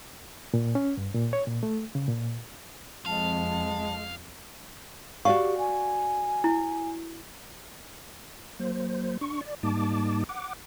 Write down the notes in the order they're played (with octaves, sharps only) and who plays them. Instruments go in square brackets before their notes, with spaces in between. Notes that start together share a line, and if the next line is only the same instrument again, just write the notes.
[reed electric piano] A#2
C#4
G2
A#2
C#5
A#2
A3
C#3
A#2
[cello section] F2 [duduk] G#3 [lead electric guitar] F5 [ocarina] A5
[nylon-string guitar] F#4 D5 F5 [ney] G4 [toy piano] C#6
[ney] G#5
[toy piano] E4
[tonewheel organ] F#3 A#3 C5
D4 C#6
D5
G#2 G3 A#3 D#4 A5 D6
F#5 D6